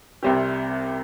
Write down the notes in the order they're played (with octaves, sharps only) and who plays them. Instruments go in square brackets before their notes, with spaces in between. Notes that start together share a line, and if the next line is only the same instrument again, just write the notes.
[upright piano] C2 C3 G3 C4 G4